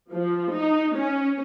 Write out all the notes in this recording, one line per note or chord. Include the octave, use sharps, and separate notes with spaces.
F3
D#4
C#4